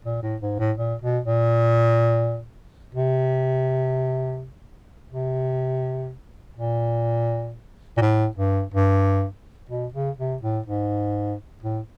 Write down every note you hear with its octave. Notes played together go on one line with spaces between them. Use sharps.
A#2
A2
G#2
A2
A#2
B2
A#2
C3
C3
A#2
A#2
A2
G2
G2
B2
C#3
C3
A2
G#2
A2